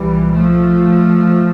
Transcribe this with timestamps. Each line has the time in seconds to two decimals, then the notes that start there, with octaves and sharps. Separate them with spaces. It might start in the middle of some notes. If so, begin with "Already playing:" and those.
Already playing: C2 A#2 E3 G3
0.33 F3 A3